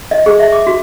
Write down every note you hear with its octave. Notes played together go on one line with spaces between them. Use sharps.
D#5
G#4
E5
D6
F#4